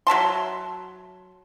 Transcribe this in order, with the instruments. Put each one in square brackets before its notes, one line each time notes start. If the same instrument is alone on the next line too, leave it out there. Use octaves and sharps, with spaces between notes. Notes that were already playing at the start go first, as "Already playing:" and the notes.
[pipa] F#3 E5 A5 C6